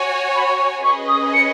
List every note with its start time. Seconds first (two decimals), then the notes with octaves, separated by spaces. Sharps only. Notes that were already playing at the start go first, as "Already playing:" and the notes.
Already playing: F#4 C#5 G#5
0.36 B5
0.59 C#6
0.84 C#4 G#4 B4 D#5 C#6
1.08 D#6
1.34 C#7